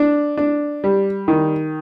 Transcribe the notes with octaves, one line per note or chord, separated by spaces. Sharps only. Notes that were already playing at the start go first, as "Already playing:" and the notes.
Already playing: D4
D4
G3
D#3